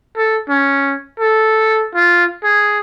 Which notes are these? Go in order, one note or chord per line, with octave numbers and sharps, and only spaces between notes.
A4
C#4
A4
F4
G#4